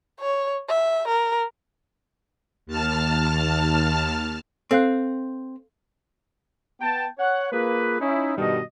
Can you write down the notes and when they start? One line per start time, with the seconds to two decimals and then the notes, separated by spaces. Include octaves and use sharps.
0.21 C#5
0.69 E5
1.08 A#4
2.66 D#2 A5 F6
4.71 C4 A4 F5 F#6
6.80 B3 G5 A5
7.18 C#5 F#5
7.51 A#3 F4 G#4 B4
8.01 C#4 D#4 E4
8.37 G2 B2 D#3 G3 A4 D#5